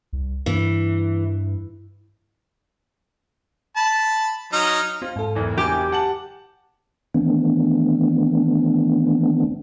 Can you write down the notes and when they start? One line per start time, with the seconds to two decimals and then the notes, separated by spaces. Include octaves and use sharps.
0.13 C2
0.46 G2 E3
3.76 A5 B5
4.53 F#3 D#4 F6
5.02 C4 F4
5.16 G#2 A4
5.35 F#1 E2 E3
5.57 G4 G#5 D6 G6
5.92 F#5 A5 F#7
7.14 D#3 E3 A3 B3 C4 D4